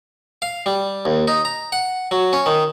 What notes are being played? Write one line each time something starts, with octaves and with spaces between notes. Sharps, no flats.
F5
G3
D#2
D#4
A#5
F#5
F#3
C#4
D#3